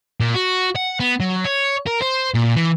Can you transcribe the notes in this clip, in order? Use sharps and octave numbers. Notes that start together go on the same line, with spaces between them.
A#2
F#4
F#5
B3
F#3
C#5
A#4
C5
A#2
E3